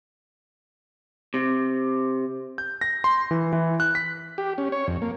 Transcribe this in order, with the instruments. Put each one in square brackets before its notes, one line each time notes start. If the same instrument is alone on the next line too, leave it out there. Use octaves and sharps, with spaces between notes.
[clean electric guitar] C3
[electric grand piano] G6
A#6
C6
E3
E3
F#6
B6
[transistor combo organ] G4
C#4
C#5
F2
A#3